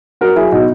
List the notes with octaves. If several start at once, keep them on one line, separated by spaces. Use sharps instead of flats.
F#3 F#4 A#4
F#3 E4 G#4
B2 D#4 F#4